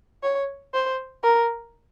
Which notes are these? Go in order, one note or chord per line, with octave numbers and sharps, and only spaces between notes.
C#5
C5
A#4